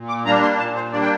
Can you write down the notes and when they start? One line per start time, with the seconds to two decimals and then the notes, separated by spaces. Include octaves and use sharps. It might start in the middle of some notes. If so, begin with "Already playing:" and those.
Already playing: A#2
0.08 D6
0.25 G3 A#3 D4 A#5
0.42 C6
0.59 A#2 A5
0.75 C5
0.92 G3 A#3 D4 D5
1.02 G5